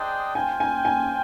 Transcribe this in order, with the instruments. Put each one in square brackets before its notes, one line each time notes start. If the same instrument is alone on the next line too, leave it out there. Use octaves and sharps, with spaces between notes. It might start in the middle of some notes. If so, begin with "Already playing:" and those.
Already playing: [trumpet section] D4 G#4 C5 D#5 G5
[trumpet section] F4 C5 G5 [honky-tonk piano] G#5
[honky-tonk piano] G#5
G#5